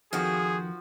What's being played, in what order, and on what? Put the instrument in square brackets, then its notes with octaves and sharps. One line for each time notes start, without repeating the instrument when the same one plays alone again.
[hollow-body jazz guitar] F2 D#3 [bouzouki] F3 F#4 [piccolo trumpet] G#4